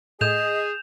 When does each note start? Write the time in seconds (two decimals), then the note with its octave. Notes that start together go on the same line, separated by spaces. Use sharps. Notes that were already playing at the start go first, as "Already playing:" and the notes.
0.21 A2 G#4 D#5 D#6 G6 E7 F7